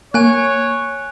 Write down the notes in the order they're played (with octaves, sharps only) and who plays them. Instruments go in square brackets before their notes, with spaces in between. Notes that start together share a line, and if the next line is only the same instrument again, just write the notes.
[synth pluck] A#3 [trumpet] C#5 [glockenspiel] G#5 F#6